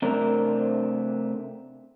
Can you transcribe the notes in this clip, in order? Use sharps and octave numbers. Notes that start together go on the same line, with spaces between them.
C3 A3 C4 D4 A#4 C5